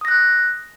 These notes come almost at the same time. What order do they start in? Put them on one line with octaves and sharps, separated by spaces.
D#6 A#6 F#6